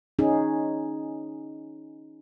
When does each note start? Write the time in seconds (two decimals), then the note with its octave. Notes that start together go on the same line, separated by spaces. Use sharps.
0.19 C#4 D#4 G#4